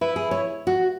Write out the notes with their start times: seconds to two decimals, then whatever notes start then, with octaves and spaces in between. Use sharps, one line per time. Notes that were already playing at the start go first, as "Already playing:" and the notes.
0.01 E4 B4
0.16 G#4
0.31 C#5
0.67 F#4